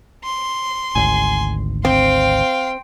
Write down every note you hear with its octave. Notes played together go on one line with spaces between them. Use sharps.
C6
G#1 D2 G#5
C4 F5 G5 C6